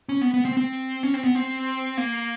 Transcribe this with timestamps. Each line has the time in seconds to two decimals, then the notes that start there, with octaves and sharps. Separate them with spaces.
0.09 C#4
0.21 B3
0.34 B3
0.45 C4
0.57 C4
1.03 C#4
1.14 C4
1.24 B3
1.35 C4
1.97 A#3